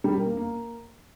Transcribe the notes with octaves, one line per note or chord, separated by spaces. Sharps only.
G3
A#4
A#3
A#3